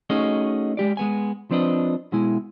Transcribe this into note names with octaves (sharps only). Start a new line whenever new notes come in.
A3 C#4 D#4 F#4 G#4 D#5
G#3 G4 D5
G#3 B3 G#5
F3 C4 D4 B4 D#5
B2 G#3 E4 G#5